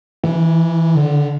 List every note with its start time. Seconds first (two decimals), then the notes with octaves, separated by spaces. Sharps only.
0.24 E3
0.95 D3